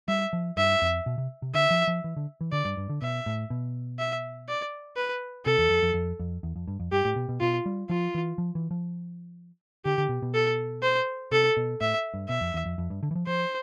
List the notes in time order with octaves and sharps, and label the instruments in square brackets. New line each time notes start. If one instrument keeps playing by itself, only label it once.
[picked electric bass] G3 [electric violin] E5
[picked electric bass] F3
[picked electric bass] G2 [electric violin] E5
[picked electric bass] F2
B2
C3
C3
[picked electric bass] D3 [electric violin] E5
[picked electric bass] F3
F3
E3
D3
E3
[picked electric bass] D3 [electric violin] D5
[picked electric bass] G2
G2
D3
[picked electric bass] B2 [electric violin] E5
[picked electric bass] A2
B2
[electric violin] E5
D5
B4
[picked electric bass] C3 [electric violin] A4
[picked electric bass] E2
F2
F2
F2
F2
E2
F2
G2
F2
[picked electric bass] G2 [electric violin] G4
[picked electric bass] A2
B2
B2
[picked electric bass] B2 [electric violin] F4
[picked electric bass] G3
[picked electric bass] F3 [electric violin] F4
[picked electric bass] E3
F3
E3
F3
[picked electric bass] D3 [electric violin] G4
[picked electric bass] D3
B2
B2
[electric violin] A4
C5
[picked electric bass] C3 [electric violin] A4
[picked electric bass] B2
[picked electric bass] A2 [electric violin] E5
[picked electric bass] G2
[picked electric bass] B2 [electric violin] E5
[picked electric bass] F2
E2
F2
F2
G2
D3
E3
F3
[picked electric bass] F3 [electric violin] C5